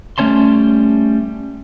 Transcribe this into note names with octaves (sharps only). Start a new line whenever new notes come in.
G3 A3 C#4 C#5 A5 C6